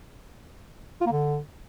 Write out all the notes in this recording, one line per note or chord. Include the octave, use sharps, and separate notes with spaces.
F4
A#3
D3